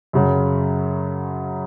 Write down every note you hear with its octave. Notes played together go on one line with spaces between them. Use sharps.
F#2 C#3 F#3